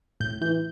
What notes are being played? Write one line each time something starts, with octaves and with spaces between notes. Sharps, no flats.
A2 G6
E3 G6